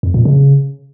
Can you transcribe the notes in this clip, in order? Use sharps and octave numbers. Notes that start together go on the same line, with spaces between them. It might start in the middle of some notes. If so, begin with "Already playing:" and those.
F2
A#2
C#3